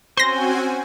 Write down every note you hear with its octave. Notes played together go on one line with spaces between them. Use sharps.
C4 C#4 F#4 C5 G#5 C6 A#6